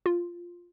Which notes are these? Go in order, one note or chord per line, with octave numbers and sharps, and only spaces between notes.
F4